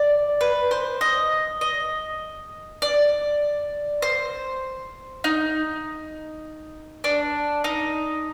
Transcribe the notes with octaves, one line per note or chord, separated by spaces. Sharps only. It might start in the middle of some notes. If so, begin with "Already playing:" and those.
Already playing: D5
B4
C5
D#5
D#5
D5
C5
D#4
D4
D#4